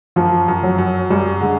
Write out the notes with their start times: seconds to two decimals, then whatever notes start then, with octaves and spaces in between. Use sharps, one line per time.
0.16 F#2 F3
0.48 F#2
0.63 F#3
0.78 F#2
1.10 F#2 G3
1.41 D3 G#3